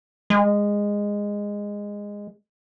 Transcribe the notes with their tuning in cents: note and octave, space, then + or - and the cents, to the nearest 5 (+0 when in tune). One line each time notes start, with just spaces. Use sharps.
G#3 -15